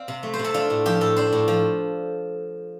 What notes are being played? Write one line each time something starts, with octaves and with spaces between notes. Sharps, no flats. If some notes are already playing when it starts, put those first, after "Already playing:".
Already playing: C4 D5 F5
C3
A3
C5
C3
A4
D4 F4
A2
F3 G4
A2 A4
D4 C5
A2
F3